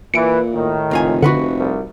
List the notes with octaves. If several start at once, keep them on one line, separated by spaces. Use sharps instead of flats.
A#2 E3 C#7 D7
A2 D#3
F1 C#2 F4 G#5
D3 F4 F#4 B4 F#5
C2